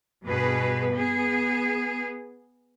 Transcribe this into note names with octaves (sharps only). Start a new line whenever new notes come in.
G2 B2 G#4 B4
B3 G#4